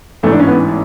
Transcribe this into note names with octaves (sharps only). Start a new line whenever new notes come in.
A1 G#2 E3 A3
D4
C#4
B3